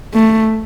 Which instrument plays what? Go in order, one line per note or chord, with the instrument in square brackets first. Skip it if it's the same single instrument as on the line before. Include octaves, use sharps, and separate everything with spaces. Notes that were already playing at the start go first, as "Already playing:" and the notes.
[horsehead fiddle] A3